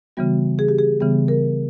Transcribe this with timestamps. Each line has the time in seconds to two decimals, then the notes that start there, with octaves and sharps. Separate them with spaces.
0.17 C#3 E3 G3 B3 F#4
0.59 G#4
0.68 G4
0.78 G#4
1.00 C#3 E3 G3 B3
1.28 A#4